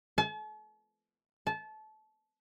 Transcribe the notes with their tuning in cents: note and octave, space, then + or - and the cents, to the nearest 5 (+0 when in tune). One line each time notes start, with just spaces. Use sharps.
A5 -45
A5 -25